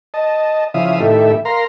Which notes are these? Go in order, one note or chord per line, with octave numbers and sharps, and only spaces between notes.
D#5 A5
C#3 F3 E4 E5 F5 D#6
A2 D#3 E4 G4 A4 E5
A#4 F5 A#5 C6